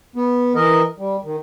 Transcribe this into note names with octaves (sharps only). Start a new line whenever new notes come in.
B3
E3 A#4 D#5
G3
D#3